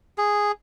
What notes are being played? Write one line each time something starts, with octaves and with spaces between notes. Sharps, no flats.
G#4